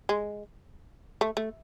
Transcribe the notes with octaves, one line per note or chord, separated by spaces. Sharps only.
G#3
A3
A3